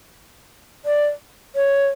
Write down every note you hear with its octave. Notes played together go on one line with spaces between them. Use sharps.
D5
C#5